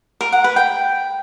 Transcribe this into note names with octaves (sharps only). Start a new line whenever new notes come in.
A#4
F#5
B4
G5